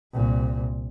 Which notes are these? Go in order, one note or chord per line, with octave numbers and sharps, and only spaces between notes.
C2 A#2